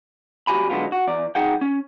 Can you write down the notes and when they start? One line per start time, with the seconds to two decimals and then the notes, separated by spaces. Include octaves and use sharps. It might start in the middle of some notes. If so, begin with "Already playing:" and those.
0.47 C2 F#2 F#4 G4 G#5 B5
0.70 D3 F#3 G#3 B3 F4
0.92 F#4
1.07 E2 D5
1.35 B1 D#4 G#4 F#5 G5
1.61 C#4